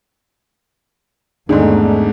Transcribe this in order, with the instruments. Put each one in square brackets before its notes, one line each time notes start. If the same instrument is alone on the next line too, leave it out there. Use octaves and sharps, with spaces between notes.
[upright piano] G#1 G#2 [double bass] E2 A3 [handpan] D4 D#4 G#4